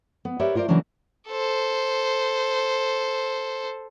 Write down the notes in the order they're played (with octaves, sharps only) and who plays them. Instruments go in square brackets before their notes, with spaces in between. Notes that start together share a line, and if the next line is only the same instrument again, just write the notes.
[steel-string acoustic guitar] B3
G4 A#4 B4 C#5 D5 E5
E4 F4 A#4 C5 D5
C#3 E3 F#3 A#3 C#4 D4
[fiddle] A4 C5